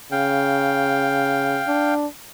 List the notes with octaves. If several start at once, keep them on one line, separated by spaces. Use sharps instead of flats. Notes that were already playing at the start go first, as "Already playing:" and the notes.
C#3 F5 G5
D4